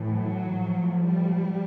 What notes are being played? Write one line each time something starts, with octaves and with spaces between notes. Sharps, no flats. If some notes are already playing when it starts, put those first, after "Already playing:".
Already playing: A2 E3
F#3
A2 F3
G3